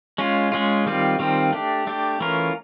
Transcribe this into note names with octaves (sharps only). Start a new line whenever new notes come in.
G#3 C#4 F4
G#3 C#4 F4
D#3 G3 C4 F4
D#3 G3 C4 F4
A3 D4 G4
A3 D4 G4
E3 A3 C#4 F4 A#4